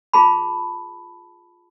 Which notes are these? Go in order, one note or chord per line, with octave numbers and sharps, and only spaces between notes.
F4 G#4 A5 B5